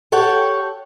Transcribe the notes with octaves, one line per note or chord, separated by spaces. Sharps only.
G4 A4 C#5 F#5 G5